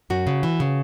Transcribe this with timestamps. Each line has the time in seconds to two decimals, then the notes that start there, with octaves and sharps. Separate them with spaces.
0.10 F#2 F#4
0.27 C#3
0.43 E3
0.60 C#3